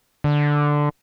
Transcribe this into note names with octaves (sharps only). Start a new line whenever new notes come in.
D3